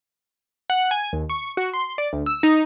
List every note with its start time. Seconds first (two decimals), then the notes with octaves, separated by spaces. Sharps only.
0.70 F#5
0.91 G#5
1.13 D#2
1.30 C#6
1.57 F#4
1.74 C6
1.98 D5
2.13 D2
2.26 E6
2.43 D#4